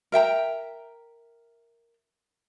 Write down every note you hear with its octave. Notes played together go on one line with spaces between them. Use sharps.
A#4 E5 G5 A#5